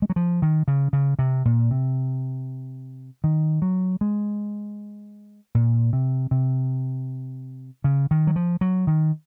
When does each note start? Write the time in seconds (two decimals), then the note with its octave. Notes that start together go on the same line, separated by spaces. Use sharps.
0.02 G#3
0.10 F#3
0.16 F3
0.42 D#3
0.68 C#3
0.93 C#3
1.19 C3
1.45 A#2
1.71 C3
3.24 D#3
3.62 F#3
4.01 G#3
5.55 A#2
5.93 C3
6.31 C3
7.84 C#3
8.11 D#3
8.27 F#3
8.36 F3
8.61 F#3
8.87 D#3